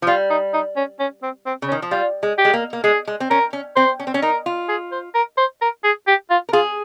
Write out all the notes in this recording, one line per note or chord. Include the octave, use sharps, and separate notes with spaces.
F3
G3 F4
D#4
D#4
C#4
C#4
C4
C4
C#3
C#4
D#3
F3
G3 F4
G#3
G4
G#3
A#3
A#3
G#3 G#4
G#3
C4
C#4 A#4
C#4
C4 C5
C#4
C4
C#4
D#4 A#4
F4
G#4
C5
A#4
C5
A#4
G#4
G4
F4
A#4
F4 G#4